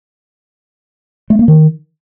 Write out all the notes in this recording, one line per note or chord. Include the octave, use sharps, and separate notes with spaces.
A3
A#3
D#3